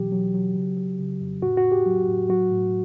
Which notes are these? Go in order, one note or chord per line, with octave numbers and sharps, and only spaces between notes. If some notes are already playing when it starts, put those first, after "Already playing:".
Already playing: B2 E3 F#3 G4
F#3
F#3
C#3
F#3
C#3
F2
A2 F#4
F#4
A2
G4
F#3
A2
F#3 F#4
A2